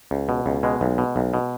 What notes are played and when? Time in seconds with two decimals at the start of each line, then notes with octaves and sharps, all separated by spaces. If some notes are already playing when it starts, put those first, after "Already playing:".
0.11 C#2
0.29 B2
0.46 C#2
0.63 B2 G#3
0.81 B1
0.98 B2
1.16 B1
1.34 B2